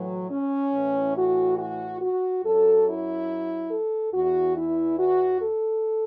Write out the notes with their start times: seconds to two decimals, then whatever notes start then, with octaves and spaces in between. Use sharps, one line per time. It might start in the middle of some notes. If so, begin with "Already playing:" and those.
Already playing: A2 E3 F#3
0.30 C#4
0.74 A2 E3
1.16 F#4
1.58 F#4
2.01 F#4
2.44 F#2 F#3 A4
2.87 E4
3.71 A4
4.13 E2 E3 F#4
4.56 E4
4.99 F#4
5.42 A4